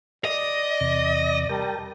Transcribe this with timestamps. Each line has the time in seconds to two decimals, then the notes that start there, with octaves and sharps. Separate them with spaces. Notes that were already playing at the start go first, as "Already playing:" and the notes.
0.25 D5 D#5
0.80 E2 C3 A#6
1.49 G3 A#4 G5 A5